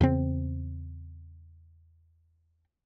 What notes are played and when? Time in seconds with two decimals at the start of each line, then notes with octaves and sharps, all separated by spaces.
0.01 E2 C#3 C4